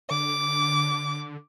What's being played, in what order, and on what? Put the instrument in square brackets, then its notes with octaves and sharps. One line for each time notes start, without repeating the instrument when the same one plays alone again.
[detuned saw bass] D3 [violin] D6